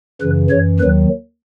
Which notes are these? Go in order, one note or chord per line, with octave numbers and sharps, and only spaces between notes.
F#2 C#3 E3 B4
F#2 E3 C#5
D#2 D#3 F#3 B4